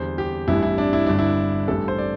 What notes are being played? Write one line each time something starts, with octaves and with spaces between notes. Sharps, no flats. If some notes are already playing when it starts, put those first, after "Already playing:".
Already playing: E2 D3 G3 C5
G4
A1 G2 G3 E4
E4
D4
E4
G1 G2 D3 D4
E4
A1 G2 G3 A4
C5
D5